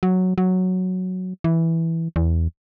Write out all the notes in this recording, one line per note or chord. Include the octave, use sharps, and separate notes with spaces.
F#3
F#3
E3
E2